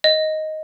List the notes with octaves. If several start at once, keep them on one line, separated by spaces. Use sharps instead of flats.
D#5